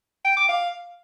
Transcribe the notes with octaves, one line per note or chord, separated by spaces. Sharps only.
G5
D6
F5